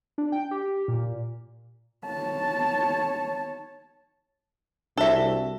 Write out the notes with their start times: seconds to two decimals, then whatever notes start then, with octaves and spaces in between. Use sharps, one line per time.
0.18 D4
0.32 G5
0.51 G4
0.88 A#2
2.07 C#5 A5
4.98 C2 D4 F#4 A4 E5